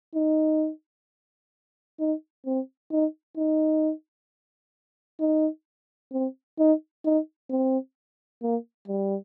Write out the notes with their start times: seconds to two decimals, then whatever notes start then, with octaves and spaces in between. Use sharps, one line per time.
0.15 D#4
1.99 D#4
2.46 C4
2.92 D#4
3.37 D#4
5.20 D#4
6.12 C4
6.59 D#4
7.05 D#4
7.50 C4
8.42 A#3
8.88 G3